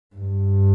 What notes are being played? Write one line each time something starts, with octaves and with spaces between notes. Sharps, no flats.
G2